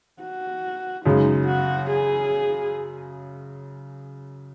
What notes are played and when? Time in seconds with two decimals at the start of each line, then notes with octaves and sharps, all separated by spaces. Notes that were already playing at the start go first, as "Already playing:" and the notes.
0.21 F#4
1.06 F#2 C#3 G#3 D#4
1.47 F#4
1.90 G#4